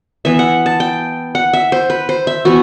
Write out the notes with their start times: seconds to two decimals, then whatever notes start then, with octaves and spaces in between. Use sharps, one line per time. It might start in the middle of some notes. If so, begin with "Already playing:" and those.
0.25 E3 B3 E5
0.39 F#5
0.66 A5
0.80 G5
1.35 F#5
1.53 E5
1.72 C5
1.90 B4
2.09 C5
2.27 E5
2.45 E3 B3 F#4